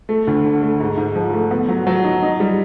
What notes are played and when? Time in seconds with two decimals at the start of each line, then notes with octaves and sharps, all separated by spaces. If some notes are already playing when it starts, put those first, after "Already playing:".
0.09 A3
0.27 D2
0.45 D3
0.62 A3
0.80 G#2
0.97 G#2
1.15 F3
1.33 A3
1.51 B3
1.69 F#3
1.87 F#3
2.04 D#4
2.23 D#4
2.40 G3